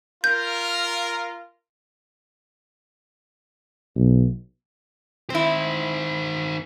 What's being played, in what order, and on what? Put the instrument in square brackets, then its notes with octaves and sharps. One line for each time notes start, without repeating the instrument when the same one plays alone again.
[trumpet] F4 [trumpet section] A#4 [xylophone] G6
[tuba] B1
[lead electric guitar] D#3 C5 [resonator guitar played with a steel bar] C4 E4